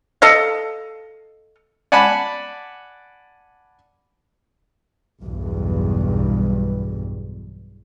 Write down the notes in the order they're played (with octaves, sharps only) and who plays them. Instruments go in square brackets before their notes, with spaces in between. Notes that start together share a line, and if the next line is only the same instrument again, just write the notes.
[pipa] A4 D#5 F5
[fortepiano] D5 F#5 G#5 A5 B5
[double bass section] B1 E2 G2